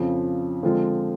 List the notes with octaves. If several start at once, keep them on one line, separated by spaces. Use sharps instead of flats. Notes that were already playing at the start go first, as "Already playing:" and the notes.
Already playing: F2 C#3 F3
D3 F3 G#3 C4 F4